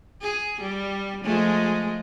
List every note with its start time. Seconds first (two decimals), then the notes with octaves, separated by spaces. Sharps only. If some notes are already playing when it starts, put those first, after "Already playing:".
0.21 G#4
0.61 G3
1.24 F3 G#3 A3